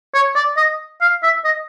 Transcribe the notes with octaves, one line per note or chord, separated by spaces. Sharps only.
C#5
D5
D#5
F5
E5
D#5